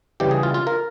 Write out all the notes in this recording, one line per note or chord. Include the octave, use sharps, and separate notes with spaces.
C#3 E3 G3 G4
G#4
F4
F4
A#4